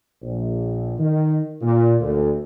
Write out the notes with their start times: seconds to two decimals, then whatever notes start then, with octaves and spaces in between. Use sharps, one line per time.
0.22 A#1
0.99 D#3
1.61 A#2
2.00 D2